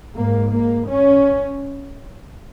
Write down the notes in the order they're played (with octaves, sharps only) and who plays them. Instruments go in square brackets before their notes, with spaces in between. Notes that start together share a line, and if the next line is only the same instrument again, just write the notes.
[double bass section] G#2 A#3
A#3
C#4